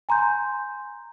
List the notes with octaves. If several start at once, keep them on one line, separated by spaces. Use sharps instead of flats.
G#5 A#5 C6 G6